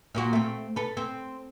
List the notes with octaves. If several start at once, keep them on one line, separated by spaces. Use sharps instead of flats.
A#2 A#3 F#4
A3 C4
A4 B4
C4